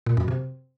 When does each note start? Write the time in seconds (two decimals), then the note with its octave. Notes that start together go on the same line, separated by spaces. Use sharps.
0.06 A#2
0.17 F#2
0.28 C3